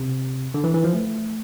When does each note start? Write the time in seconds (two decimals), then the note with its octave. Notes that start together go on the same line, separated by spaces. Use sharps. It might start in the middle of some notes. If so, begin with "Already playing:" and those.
Already playing: C3
0.54 D3
0.64 E3
0.74 E3
0.84 F3
0.94 A3